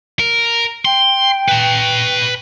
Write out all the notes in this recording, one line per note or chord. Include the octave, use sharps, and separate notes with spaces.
A#4
G5 C6
B4 A5